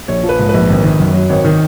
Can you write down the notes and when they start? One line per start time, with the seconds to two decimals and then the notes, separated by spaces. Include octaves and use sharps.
0.08 A#1 C#5
0.23 F3
0.29 B4
0.39 G#2
0.49 B4
0.54 A#1
0.70 G#1
0.84 D#3
1.00 F#2
1.14 F#3
1.29 G#1 C#5
1.45 D#3